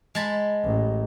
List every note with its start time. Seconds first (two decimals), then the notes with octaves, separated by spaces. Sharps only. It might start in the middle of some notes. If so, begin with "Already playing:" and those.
0.15 G#3 A5 B5
0.65 A1